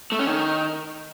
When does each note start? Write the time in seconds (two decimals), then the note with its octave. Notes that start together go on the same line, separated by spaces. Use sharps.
0.12 A3
0.19 C#4
0.27 D#3